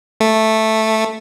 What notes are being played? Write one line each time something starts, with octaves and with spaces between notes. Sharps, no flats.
A3